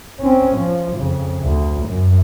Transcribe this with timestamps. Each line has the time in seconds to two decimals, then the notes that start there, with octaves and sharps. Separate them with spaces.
0.20 C4 C#4
0.56 F3
0.97 F2 C#3
1.42 D2
1.87 F#2